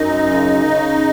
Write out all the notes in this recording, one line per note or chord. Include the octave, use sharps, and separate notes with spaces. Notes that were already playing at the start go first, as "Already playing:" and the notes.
Already playing: F#2 D#4 D#5
C#3
C#3